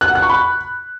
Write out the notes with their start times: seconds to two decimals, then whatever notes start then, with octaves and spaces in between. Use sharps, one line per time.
0.01 F#6
0.08 F#5
0.15 F#6
0.22 C#6
0.29 B5